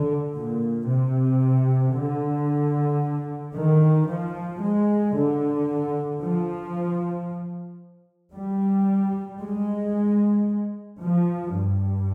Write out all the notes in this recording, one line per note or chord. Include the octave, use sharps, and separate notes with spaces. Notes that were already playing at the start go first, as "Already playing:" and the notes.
Already playing: D3
A#2
C3
D3
D#3
F3
G#3
D3
F3
G3
G#3
F3
G2